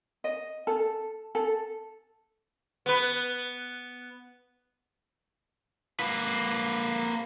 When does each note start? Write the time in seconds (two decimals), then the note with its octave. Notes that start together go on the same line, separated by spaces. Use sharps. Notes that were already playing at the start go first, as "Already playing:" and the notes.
0.24 D#5
0.67 A4
1.35 A4
2.86 B3 B4
6.00 A#3 B4